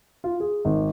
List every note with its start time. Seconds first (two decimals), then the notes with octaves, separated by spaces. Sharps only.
0.24 F4
0.40 G#4
0.65 G#1